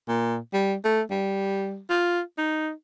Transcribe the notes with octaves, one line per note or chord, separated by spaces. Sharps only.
A#2
G3
A3
G3
F4
D#4